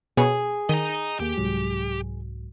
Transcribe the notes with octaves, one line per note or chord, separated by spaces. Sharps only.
B2 B3 G#4 C#5
D#3 D#5 A#5
D#2 A#3 G4 G5
C2 G#2 F#3